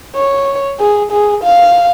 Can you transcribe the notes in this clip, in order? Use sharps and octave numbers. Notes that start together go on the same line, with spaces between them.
C#5
G#4
G#4
F5